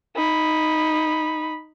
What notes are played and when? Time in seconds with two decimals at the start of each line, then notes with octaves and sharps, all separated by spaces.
0.15 D#4 B5